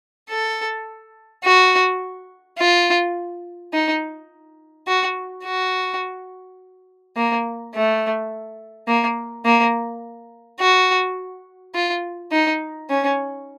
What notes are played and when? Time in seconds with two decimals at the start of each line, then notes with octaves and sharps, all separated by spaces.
0.29 A4
1.44 F#4
2.59 F4
3.73 D#4
4.87 F#4
5.44 F#4
7.17 A#3
7.74 A3
8.88 A#3
9.45 A#3
10.60 F#4
11.74 F4
12.32 D#4
12.90 C#4